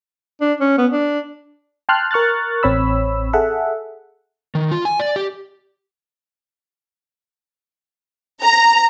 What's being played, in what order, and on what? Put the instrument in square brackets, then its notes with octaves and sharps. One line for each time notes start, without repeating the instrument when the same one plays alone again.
[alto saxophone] D4
C#4
B3
D4
[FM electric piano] G5 A5 C6 F6 F#6
A#4 C#6 F6 F#6 A6
A1 C4 C#5 B5 E6
G#4 A4 E5 F#5
[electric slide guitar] D#3
F4
G#5
D5
G4
[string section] A#5